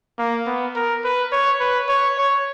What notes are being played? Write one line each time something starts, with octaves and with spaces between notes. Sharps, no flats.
A#3
B3
A#4
B4
C#5
B4
C#5
C#5